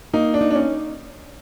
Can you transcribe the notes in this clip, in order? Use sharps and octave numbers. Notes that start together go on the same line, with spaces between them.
A#3 D#4
D4
D#4
D4
C#4